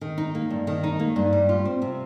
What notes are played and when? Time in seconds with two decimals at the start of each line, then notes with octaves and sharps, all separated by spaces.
0.01 D#3
0.18 D#4
0.35 A#3
0.50 G2
0.67 D#3
0.83 D#4
0.99 A#3
1.16 G2
1.33 G3
1.49 F4
1.65 C4
1.82 C3